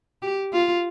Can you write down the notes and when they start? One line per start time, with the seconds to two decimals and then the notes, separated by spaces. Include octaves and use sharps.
0.22 G4
0.53 F4